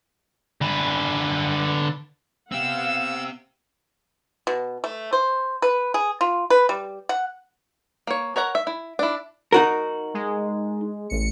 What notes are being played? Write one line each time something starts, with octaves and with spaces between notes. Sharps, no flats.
D3 B4
B3 C4 G4 F5 F#5 E6
B2
A3
C5
B4
G#4
F4
B4
G3
F#5
A#3 C#5
A#4 C#5 F#5 A#5
E5
E4
D4 E4
D#4 F#4 A#4
G#3
A1 C#7